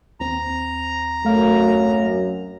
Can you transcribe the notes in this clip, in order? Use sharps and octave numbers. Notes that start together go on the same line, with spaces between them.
D#2 C4 A#5
F#2 A3 F5